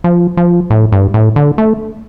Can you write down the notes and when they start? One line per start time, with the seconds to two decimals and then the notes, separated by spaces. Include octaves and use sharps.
0.04 F3
0.37 F3
0.70 A2
0.92 G2
1.14 A2
1.36 D3
1.58 A3